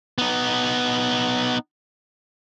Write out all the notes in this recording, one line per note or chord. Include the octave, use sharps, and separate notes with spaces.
B3 D#4